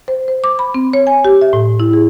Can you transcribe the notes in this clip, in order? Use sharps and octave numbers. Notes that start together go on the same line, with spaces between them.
C5
C5
D6
B5
C4
C#5
G#5
G4
E5
A2
E4
G#4